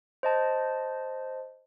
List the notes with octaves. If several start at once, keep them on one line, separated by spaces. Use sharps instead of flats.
C5 D#5 A5